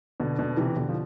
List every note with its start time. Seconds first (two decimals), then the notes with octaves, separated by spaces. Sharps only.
0.20 B2 D3
0.39 B2 D3
0.57 C3 E3
0.76 B2 D3
0.89 F3